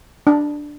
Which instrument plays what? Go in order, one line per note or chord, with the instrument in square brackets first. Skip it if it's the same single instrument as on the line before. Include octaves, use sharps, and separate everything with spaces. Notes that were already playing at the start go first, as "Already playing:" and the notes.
[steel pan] D4